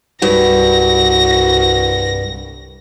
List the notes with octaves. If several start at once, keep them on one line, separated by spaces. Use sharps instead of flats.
C2 G2 F#4 A#6